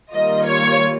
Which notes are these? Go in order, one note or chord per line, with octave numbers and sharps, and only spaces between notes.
D#3 G3 A#3 F4 D#5
C#5